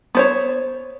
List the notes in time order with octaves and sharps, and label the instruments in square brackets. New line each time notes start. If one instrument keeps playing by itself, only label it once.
[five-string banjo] B3 C5 C#5